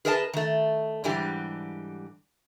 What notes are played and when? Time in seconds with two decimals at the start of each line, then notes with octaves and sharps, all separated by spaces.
0.05 G#4 A#4 B4 D#5 F5 A5
0.33 D#3 A3
1.04 G#2 D3 E3 G3 G4